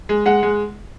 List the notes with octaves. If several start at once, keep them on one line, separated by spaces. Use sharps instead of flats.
G#3
G#3 F#5
G#3